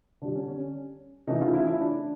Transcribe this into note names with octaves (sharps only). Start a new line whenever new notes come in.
D3 G3 D4
C#4
C#4
C#3 E3 A3 D#4
F4
E4
E4
D4